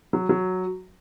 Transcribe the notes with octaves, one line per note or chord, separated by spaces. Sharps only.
F#3
F#3